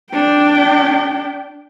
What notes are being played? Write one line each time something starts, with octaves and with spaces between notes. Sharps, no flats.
D4 G5